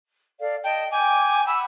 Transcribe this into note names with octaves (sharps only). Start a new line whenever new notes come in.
A4 D5 F5
D#5 G5 A5
G5 G#5 D6
F#5 B5 E6